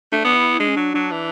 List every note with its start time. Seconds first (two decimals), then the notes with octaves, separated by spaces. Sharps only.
0.12 A3 D4
0.25 B3
0.36 E4
0.59 G#3 D4
0.68 C#4
0.76 F#3 D4
0.94 F#3 D4
1.11 E3